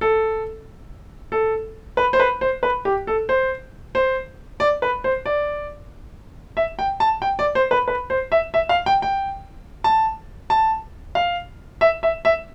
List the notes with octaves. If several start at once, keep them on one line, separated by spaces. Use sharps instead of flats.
A4
A4
B4
C5
B4
C5
B4
G4
A4
C5
C5
D5
B4
C5
D5
E5
G5
A5
G5
D5
C5
B4
B4
C5
E5
E5
F5
G5
G5
A5
A5
F5
E5
E5
E5